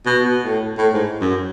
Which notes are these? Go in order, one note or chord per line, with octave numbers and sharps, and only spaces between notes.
B2
B2
A2
A2
G#2
F#2